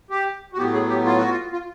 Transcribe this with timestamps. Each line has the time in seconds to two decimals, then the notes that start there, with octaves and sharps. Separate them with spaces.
0.10 G4
0.53 F#4
0.57 A2 F#3 B3 G4
0.73 G#4
0.89 G4
1.05 F4
1.18 F#4
1.30 F4
1.52 F4